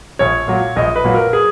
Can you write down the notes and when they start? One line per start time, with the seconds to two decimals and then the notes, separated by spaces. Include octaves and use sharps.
0.19 A#1 C#5
0.48 A#2 F#3
0.76 A#1 D#5
0.96 B4
1.04 A#2 F#3
1.14 A#4
1.33 G#4